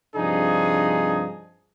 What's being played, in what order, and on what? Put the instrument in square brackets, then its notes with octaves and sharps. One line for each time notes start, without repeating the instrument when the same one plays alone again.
[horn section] G2 C3 F3 D4 D#4 G#4